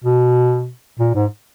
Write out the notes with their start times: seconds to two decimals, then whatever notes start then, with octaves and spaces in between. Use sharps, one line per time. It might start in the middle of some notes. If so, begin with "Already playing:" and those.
0.04 B2
0.99 A#2
1.15 G#2